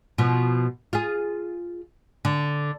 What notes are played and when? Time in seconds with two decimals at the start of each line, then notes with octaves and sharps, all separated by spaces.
0.18 B2 F3
0.93 F4 G#4
2.25 D3